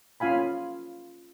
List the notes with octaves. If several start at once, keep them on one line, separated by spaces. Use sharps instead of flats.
C#4 F4 F5 G#5 B5